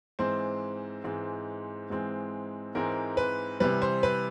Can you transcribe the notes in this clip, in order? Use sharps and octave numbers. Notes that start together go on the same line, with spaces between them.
G#2 E3 G#3 C4 C5
G#2 E3 G#3 C4
G#2 E3 G#3 C4
G#2 E3 G#3 C4 A#4
B4
C3 E3 G3 B4
C5
B4